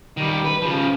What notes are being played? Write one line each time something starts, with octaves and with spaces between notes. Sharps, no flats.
D#3 G3
B4
C#3 F3